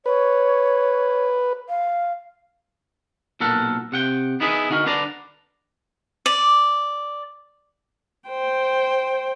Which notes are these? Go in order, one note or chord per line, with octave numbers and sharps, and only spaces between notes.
B4 C#5
F5
B1 A#2 A4 A#4 F#5
C3 F#5 G5
B3 D#4 E4 G#4 A4 B4
D3 D#4 F#4 G4 A#4
D3 D4 B4 D5 A#5
D5
C5 G5